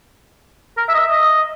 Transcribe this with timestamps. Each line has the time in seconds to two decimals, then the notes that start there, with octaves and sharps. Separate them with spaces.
0.77 A#4
0.88 E5
0.94 D#5
0.99 E5
1.10 D#5